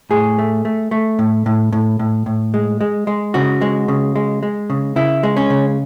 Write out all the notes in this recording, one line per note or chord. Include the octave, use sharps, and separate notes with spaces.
A2 G#4
A3
A3
A3
A2
A2
A2
A2
A2
G#3
G#3
G#3
C#3 F#4
G#3
C#3
G#3
G#3
C#3
C#3 E4
G#3
C#4
C#3